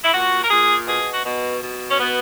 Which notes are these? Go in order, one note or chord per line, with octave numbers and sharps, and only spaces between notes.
E4
A#2 F#4
A#4
A#2 G#4
B2 G#4
F#4
B2
B2
C#4
B2 B3